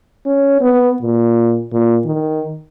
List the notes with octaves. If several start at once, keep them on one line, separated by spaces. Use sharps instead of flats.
C#4
B3
A#2
A#2
D#3